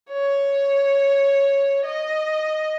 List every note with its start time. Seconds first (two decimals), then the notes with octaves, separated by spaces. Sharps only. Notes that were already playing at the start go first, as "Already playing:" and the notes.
0.11 C#5
1.85 D#5